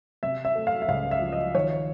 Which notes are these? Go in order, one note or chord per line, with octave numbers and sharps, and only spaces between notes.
C3 E5
E5
A3
F5
E5
C#2 F5
E5
F3
D#5
D#3 C#5